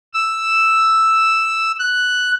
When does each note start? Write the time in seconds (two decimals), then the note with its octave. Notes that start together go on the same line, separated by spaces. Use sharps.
0.14 E6
1.79 F#6